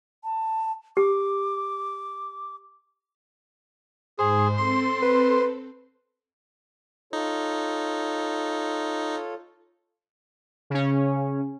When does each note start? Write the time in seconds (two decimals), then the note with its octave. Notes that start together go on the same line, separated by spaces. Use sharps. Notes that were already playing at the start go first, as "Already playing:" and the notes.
0.24 A5
0.97 G4 D6
4.19 G#2 G#4 C5
4.57 C4 A4 C6
5.02 B4
7.13 D#4 F4 A4 C#5
10.70 C#3 C#4